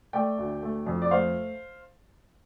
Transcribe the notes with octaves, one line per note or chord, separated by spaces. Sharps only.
A3 D5 G5
D2
A3
F2
D5
A3 C5 F5